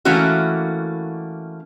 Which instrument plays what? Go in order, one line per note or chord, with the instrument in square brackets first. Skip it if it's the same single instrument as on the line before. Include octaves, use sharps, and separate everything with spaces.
[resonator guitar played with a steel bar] E3 A3 A#3 C#4 F#4